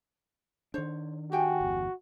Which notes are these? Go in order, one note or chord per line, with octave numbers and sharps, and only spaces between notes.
D#3 D4 C5 C#5
F#4 G4 G5 G#5
G1 E2